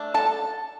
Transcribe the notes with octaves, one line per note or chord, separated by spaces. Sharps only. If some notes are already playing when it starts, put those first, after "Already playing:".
Already playing: A3 D4
A4 A5